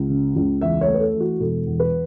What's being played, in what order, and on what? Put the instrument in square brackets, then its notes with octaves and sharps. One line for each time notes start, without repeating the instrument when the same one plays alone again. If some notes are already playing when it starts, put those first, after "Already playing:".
Already playing: [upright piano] C#2
C#3
C#2
E2 E5
C#5
A3
B4
A4
E3
F#4
E1 A4
E2
B4